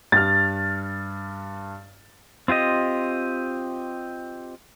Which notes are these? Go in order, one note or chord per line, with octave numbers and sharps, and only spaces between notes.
G2 F6 A6
C4 F4 G4 D#5